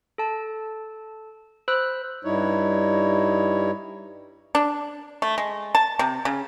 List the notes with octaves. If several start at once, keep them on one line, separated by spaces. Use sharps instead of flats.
A4 A5
C5 B5 E6 F#6
G2 G3 D#4 E4 C#5
D4
A3
G#3
A5
C3
C#3